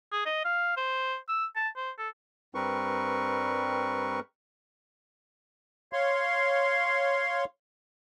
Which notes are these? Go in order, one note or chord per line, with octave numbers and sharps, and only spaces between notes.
G#4
D#5
F5
C5
E6
A5
C5
A4
G2 G3 C4 A#4 B4 C#6
C#5 F5 C6